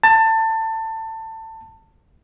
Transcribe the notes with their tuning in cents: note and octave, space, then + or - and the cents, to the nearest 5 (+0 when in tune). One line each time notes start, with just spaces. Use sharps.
A5 +20